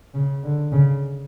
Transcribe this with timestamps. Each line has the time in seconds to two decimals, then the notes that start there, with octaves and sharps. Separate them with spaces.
0.14 C#3
0.43 D3
0.72 C#3